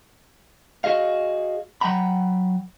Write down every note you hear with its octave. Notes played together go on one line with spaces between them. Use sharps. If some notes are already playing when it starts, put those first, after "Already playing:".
F#4 G#4 D#5 F5
F#3 F#5 G5 A#5 B5